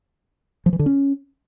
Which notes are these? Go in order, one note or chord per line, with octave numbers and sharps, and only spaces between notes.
F3
E3
D3
C#4